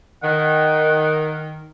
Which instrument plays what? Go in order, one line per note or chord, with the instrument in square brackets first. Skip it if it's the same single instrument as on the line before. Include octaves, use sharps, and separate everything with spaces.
[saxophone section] D#3 [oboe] F#5